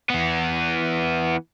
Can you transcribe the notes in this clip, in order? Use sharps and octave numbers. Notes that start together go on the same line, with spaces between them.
E3 B3